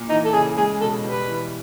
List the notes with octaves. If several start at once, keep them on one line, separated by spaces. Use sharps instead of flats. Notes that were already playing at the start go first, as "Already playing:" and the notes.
Already playing: A#2
E3 D#4
A4
C#3 G#4
G#3 G#4
B2 A4
G3 B4
E3